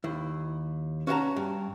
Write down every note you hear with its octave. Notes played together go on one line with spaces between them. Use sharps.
D#2 E4
C#4 F#4 F#5 A5 A#5
G2